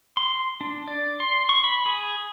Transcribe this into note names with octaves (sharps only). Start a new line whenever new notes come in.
C6
D4
D5
C6
C#6
B5
G#4